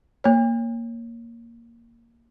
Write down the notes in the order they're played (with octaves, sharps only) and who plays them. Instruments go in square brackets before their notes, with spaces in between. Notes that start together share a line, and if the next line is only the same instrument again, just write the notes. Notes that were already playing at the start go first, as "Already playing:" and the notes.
[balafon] A#3 C#5